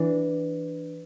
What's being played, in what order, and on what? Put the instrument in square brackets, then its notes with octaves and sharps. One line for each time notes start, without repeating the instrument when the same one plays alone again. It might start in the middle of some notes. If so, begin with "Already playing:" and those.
Already playing: [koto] E3 D4